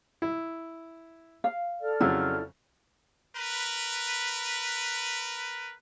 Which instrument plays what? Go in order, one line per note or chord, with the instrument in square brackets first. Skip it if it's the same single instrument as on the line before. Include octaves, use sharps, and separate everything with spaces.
[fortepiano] E4
[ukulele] F5
[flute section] A4 D5 F6
[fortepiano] F2 C#3 F#3 [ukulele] E4
[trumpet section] A#4 B4